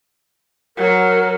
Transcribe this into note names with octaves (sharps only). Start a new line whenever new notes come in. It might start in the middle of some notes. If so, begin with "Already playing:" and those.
F#3 A#4